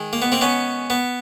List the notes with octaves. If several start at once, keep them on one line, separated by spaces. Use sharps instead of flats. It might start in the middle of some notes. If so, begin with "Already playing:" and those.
Already playing: D#3 G#3
A#3
B3
A#3 C4
B3 C#4
B3